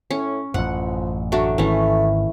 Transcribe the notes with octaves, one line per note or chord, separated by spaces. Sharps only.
A2 C#4
A1 F#2 F3 F#5
F#3 A3 D4 F#4
G#1 E3 A3 C#4